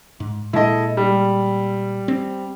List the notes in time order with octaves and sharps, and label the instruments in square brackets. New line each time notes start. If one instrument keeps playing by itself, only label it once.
[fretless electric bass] G#2
[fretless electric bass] A#2 G#3 [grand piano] E4 A4 D#5
[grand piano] G3
[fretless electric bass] C4